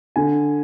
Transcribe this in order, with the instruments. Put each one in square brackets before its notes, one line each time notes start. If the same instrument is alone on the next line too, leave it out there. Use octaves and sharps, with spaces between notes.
[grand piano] D3 G#5